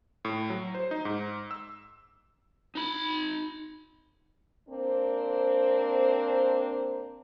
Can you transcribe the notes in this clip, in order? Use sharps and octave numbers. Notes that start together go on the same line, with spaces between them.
A2
F#3
C5
D#4
G#2
E6
D#4 B5
A#3 C4 D4 C5